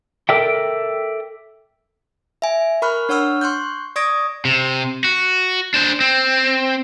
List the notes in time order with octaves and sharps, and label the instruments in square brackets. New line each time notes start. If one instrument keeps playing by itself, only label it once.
[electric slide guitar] A4 A#4 D5 E5 G5
[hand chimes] E5 G#5
A#4 B5 C#6 F6 F#6
D4 C#5 F#5 C#6 E6 F6
C6 C#6 F#6 G6
D5 C#6 D#6 G#6 A#6 D7
[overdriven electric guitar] C3
F#4
D4 C5
C4